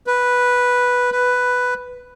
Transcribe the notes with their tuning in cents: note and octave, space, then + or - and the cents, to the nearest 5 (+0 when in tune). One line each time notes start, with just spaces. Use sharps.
B4 -5
B4 +5